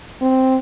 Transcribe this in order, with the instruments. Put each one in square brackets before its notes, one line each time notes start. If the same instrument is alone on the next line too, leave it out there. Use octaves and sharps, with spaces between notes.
[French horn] C4